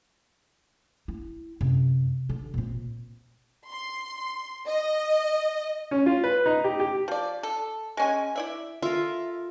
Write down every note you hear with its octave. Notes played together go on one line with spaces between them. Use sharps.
E4
F#2 C3
D3
A#2 C4
C6
D#5
C#4
F4
B4
D#4
G4
G4
F3 D5
A4
G#3 C#4 G#5
E4 D5 E5
F4 A4 A#4 E5